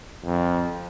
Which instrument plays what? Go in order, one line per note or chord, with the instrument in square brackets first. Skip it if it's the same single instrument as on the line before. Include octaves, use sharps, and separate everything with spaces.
[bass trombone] F2